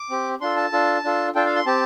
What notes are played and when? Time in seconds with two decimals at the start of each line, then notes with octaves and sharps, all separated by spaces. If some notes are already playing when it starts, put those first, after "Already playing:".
Already playing: D6
0.10 C4 G4
0.41 D4 F4 A4 C6
0.56 A5
0.73 D4 F4 A4
1.04 D4 F4 A4
1.35 D4 F4 A4 G5
1.46 F5
1.56 C6
1.66 C4 G4 A5